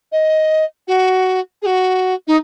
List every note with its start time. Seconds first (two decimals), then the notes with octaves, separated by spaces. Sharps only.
0.12 D#5
0.87 F#4
1.62 G#4
1.66 F#4
2.27 D#4